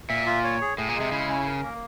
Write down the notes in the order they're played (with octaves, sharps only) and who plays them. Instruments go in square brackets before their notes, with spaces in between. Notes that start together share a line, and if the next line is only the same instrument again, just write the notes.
[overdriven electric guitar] A#2 [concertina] E5
[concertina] F4
C#5
G#4
[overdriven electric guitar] A2 [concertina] G#4
[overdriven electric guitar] A#2
[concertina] G#3
[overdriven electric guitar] C3
[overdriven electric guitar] C#3 [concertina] E4
[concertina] C#4
A#4
A#3